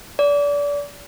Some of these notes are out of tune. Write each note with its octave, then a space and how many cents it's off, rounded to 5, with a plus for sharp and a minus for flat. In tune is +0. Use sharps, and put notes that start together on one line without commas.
D5 -30